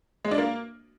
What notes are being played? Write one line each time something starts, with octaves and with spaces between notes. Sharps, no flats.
G#3
D4
A#3